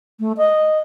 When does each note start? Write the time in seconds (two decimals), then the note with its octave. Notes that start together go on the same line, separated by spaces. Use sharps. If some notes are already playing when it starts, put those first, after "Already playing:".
0.20 A3
0.37 D#5